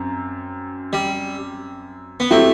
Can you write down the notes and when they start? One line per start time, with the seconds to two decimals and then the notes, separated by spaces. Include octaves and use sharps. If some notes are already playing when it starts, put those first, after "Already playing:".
Already playing: F#2 C4
0.93 G3
2.20 B3
2.31 F#3 A3 C4 E4 G4